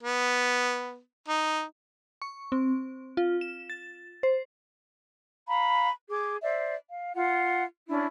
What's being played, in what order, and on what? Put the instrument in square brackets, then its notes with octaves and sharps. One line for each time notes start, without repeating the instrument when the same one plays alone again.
[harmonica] B3
D#4
[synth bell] C#6
C4
F4
E7
A6
C5
[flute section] F5 A#5 B5
G#4 D6
C5 D5 E5
F5
F4 F#5
C#4 D4 E4